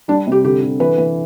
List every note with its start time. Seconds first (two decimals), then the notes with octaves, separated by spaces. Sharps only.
0.08 G3 D4
0.27 C3
0.32 G4
0.44 D3 G4
0.62 D3
0.80 E3 B4
0.98 E3